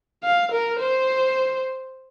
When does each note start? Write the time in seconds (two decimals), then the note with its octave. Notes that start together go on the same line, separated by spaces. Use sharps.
0.24 F5
0.52 A#4
0.80 C5